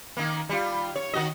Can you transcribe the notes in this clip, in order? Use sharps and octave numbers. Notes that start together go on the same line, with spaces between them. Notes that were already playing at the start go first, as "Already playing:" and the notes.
D#3 A#3
G3 F4
C#5
D#3 F#4 D#5